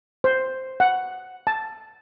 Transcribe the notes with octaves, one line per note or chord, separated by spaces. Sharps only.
C5
F#5
A5